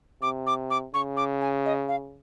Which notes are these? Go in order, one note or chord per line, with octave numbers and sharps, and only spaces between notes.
C3 D6
D6
D6
C#3 C#6
D6
G#5
D#5
F5